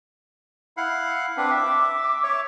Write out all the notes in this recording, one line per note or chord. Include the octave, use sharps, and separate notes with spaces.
E4 F5 F#5
C4 D4 B4 D6
E5
C#5 E5